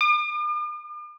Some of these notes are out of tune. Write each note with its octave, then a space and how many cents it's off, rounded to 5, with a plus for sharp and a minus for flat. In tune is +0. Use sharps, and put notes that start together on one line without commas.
D6 +45